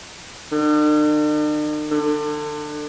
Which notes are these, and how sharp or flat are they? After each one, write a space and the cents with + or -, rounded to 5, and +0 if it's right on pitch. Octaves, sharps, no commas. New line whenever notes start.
D3 +45
D3 +30